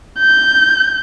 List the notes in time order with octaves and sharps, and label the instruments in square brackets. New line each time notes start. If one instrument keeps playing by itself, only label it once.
[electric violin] G6